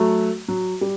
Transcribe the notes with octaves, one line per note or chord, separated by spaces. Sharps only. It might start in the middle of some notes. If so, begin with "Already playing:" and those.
Already playing: F#3 A3
F#3
G3